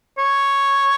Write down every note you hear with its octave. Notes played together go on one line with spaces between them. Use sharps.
C#5